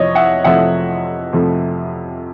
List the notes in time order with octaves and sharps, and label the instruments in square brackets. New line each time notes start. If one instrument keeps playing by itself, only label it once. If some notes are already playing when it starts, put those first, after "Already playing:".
Already playing: [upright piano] F2 C3 F3 C#5 D#5
E5 F#5
F2 C3 F3 A3 E5 F#5
F2 C3 F3 A3